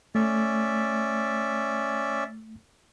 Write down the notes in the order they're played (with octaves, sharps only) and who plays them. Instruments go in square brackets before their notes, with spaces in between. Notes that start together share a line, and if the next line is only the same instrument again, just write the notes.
[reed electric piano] A3 [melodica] C#4 D5 E5